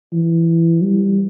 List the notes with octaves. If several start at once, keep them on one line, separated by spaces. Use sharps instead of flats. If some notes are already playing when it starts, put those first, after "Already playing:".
E3
G3